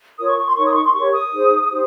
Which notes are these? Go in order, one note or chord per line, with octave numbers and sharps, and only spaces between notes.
F4 A#4 C#5 D#6
C#6
C#6
C6
D#4 A#4 C#5 C#6
D#6
C6
C#6
C6
G4 A#4 C#5 C#6
D#6
D#4 G#4 C5
D#4 G4 C5